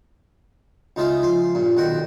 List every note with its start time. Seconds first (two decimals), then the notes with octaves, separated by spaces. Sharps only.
0.96 C#2 D#4 F4 G#4 E5 F5
1.22 F3 G#5 C6
1.55 G2 A#2
1.77 B1 D#3 F#4 F#5 G5